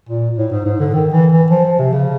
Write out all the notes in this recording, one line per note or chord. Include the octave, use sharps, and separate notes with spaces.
A#2
A2
G#2
G#2
D3
D#3
E3
E3
F3
F3
C3
C#3